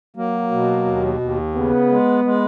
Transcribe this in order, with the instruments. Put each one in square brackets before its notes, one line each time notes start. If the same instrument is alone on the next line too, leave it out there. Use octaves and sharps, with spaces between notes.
[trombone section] F#3 [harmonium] A#3
[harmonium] B2
D#2
D#2
[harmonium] C#3 [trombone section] B3
[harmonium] G#3
G#3